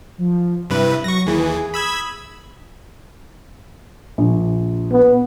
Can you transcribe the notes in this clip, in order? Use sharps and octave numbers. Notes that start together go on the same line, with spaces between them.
F3
G2 C3 E4 B4
F#3 C#6 A#6
D#2 E3 G#4
B5 D#6 E6 G#6
A#1
B3